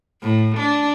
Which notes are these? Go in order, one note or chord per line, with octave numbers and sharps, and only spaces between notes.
A2
D4